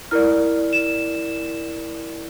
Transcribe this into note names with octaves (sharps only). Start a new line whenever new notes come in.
E4 A#4 D5 F6
E7